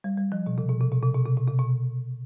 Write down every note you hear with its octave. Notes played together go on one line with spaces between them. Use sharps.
G3
G3
F3
B2
C3
B2
C3
B2
C3
B2
C3
B2
C3
B2